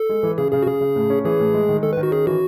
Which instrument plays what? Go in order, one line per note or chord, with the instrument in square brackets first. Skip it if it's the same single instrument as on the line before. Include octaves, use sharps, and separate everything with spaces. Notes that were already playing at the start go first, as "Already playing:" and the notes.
Already playing: [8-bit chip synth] A4
[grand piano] G#3
E3
[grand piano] C#3 [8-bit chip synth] G#4
[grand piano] C#3 [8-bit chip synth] G#4
[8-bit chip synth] F#4
[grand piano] C#3 [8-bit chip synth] G#4
[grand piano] C#3
A2
C#4
[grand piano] E3 [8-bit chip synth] G#4
[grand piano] A2
G#3
D#3
[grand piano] D#3 [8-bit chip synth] A4
[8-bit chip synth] B4
[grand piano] D#3
[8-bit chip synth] F#4
[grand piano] C#4 [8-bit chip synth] G#4
[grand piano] E3 [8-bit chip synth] F#4